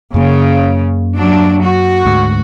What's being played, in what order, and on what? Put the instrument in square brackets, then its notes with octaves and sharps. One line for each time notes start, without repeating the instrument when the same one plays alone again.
[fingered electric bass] F#2 A#3 [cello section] C#3
[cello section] F#3 D4
F#4
[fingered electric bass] D2 G#2